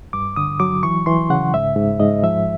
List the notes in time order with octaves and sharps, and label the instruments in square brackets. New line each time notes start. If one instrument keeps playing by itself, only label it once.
[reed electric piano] G2 D6
D3 D#6
F#3 D6
E3 C#6
E3 C6
C#3 F#5
G#2 E5
G#2
G#2 D#5
F3 E5